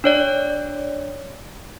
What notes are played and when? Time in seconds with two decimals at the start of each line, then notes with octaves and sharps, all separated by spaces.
0.04 D4 C#5 D5